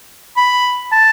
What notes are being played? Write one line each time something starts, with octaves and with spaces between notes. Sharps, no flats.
B5
A5